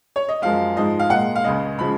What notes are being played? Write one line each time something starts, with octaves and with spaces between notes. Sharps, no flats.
C#5
D#5
F#2 F3 G#3 F5
G#2 F3 G#3 D#5
F5
A#2 G#3 F#5
F5
C#2 C#3 G#3 D#5
C#3 F3 G#3 B5